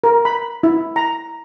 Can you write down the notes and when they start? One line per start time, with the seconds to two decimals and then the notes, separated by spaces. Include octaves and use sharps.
0.04 A#4
0.25 B5
0.63 E4
0.96 A#5